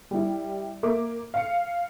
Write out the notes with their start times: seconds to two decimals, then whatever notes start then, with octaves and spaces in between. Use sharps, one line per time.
0.11 G3 E4
0.83 A#3 E5 D6
1.34 F5 C#7